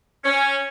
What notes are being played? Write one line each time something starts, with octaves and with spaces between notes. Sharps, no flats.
C#4